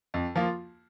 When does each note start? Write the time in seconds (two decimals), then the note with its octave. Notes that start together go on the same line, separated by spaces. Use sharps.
0.14 F2
0.36 F3 A#3 F4